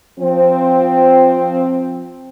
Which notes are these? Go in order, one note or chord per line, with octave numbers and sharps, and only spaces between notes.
F3 C4